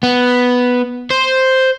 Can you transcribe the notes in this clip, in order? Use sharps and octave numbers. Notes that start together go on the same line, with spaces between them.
B3
C5